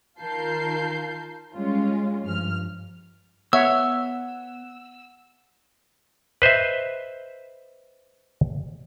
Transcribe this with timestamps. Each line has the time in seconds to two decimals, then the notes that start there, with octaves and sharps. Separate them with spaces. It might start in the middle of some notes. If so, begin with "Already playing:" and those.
0.21 D#3 F4 A#4 A5 G6 C7
1.54 G3 G#3 C#4 F4
2.23 G2 F3 F6
3.53 B3 C#5 E5 F#5 E6
6.42 B4 C5 D#5 E5